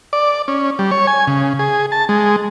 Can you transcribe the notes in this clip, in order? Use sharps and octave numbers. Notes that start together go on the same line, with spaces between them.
D5
C#4
G3
C#5
G#5
C#3
G#4
A5
G#3